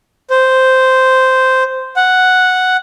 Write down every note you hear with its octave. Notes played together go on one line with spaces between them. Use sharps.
C5
F#5